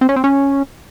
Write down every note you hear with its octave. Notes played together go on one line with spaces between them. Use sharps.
C4
C#4
C4
C#4